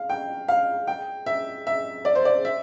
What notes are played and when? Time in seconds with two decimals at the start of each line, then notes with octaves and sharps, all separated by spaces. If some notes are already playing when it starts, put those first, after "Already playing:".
Already playing: F5
0.10 G5
0.48 F5
0.87 G5
1.26 E5
1.67 E5
2.05 D5
2.15 C5
2.25 D5
2.45 E5